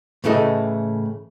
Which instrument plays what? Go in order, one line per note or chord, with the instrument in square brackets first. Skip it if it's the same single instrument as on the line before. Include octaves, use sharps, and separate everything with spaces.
[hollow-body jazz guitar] A2 C#3 E3 A3 A4 D#5